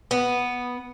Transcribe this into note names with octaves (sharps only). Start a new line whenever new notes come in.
B3